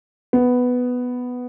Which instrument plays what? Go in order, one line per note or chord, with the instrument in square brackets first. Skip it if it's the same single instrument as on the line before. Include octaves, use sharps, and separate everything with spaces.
[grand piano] B3